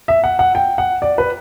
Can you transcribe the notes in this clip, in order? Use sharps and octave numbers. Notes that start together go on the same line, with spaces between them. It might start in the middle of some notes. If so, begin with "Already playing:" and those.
E5
F#5
F#5
G5
F#5
D5
B4